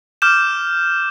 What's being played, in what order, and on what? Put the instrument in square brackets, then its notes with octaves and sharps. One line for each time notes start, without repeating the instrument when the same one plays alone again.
[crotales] D6 F6 G6 E7